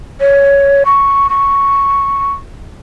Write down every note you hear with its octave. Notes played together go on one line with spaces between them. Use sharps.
C#5
C#6
C#6